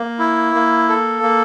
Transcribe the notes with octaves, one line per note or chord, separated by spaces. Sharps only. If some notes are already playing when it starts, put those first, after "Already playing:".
Already playing: A#3
E4
A#3
A4
A#3